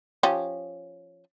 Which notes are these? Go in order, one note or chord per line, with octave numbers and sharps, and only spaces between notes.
F3 C#4 G4